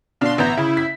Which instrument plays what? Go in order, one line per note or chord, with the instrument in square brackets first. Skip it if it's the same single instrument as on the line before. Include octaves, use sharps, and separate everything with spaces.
[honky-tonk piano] B2 D4 [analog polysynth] F5 C6
[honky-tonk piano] A1 B3 G6 [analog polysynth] E5 A#5
[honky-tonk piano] C#3 [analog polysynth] E4
[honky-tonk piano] B6